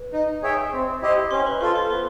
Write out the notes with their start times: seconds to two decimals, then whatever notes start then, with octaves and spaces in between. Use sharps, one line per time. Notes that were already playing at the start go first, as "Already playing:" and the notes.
Already playing: B4
0.13 D#4
0.43 G#4 C#5 E5 G5
0.72 C4
1.02 E4 G4 C5 D#5
1.31 C#4 C5 C6
1.46 B4 B5
1.61 F4 A4 C5 C6
1.75 C5 C6
1.90 B3 C5 C6